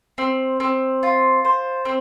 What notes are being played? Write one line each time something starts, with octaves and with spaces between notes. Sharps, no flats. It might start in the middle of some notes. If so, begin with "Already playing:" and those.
C4
C4
F4
C5
C4